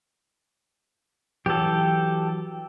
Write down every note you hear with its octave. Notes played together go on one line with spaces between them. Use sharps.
E3 F#3 G4 A4